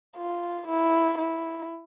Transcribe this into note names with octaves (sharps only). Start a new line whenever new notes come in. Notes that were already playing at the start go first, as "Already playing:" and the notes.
F4
E4
E4